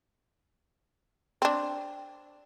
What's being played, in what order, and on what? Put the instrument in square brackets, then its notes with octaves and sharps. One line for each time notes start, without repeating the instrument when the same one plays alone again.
[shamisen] C4 D4